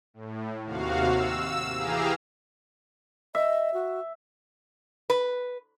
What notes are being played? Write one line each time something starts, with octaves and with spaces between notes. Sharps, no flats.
A2
D#2 C3 F#4 F5
E6
E3 G4 G#4 F5 A#5
D#5 E5
F#4
B4